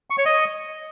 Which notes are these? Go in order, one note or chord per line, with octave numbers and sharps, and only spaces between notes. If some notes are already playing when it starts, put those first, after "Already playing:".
C#6
C#5
D#5